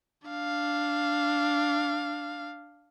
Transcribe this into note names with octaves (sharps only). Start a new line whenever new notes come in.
D4 F5